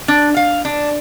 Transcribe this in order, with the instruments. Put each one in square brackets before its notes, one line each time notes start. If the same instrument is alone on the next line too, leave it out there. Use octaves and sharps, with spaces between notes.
[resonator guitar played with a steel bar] D4
F5
D4